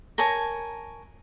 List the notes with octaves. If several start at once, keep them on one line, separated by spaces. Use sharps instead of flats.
A#4 C#5 G#5 A5